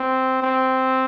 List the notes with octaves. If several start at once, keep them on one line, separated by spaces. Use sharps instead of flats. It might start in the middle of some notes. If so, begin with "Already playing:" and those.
Already playing: C4
C4